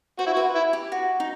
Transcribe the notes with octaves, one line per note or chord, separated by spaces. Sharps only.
F#4 C5
E4
F#4
B4
E4
G4
F#4
D#4